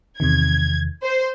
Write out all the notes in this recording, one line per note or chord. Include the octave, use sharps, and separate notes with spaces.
E2 C3 D#3 G#6
C5